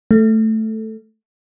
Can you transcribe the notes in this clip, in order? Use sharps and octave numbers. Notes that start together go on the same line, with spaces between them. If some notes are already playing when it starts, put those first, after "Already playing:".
A3